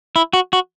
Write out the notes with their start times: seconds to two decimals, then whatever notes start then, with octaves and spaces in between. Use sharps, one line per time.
0.16 E4
0.33 F#4
0.53 F#4